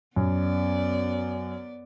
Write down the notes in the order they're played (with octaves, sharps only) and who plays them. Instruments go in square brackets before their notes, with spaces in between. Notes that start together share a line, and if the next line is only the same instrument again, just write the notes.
[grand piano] F#2 [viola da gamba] B3 D5